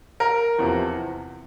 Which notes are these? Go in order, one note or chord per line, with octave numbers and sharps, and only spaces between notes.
A#4
E2 C3 F3